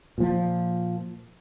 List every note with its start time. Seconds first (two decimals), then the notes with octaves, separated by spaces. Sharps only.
0.18 A#2 F3